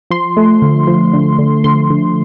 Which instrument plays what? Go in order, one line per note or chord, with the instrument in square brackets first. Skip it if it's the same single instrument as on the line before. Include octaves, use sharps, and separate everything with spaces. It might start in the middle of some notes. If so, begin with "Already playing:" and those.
[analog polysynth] F3 C6
A3
D3
F3
D3
D3
D3 C6
D3